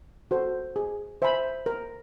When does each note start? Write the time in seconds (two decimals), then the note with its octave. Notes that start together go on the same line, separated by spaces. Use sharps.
0.31 F#4 A4 C5
0.76 G#4
1.22 C5 E5 G#5 B5
1.66 A#4